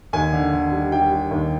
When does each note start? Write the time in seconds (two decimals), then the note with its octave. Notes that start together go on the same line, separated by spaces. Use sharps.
0.13 D#2 G#5
0.33 D3
0.53 D3
0.72 G3
0.92 G3 G5
1.11 G3
1.31 D#2